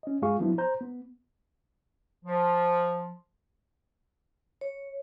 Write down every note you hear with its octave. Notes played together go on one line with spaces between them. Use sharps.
C#4 D#5
G2 G#3 F4 G#4 F5 C#6
F3 F#3 B3 D4 E4
C5 A#5 G6
B3
F3
C#5